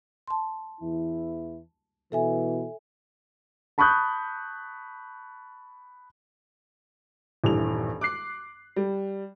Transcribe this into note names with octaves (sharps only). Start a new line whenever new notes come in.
A5 C6
E2 E3 E4
B2 E3 A4 E5 G#5
A5 B5 C#6 D#6 F#6 G6
D#1 G2 E3 F7
D6 F#6 C7
G3